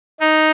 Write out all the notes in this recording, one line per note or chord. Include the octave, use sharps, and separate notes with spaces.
D#4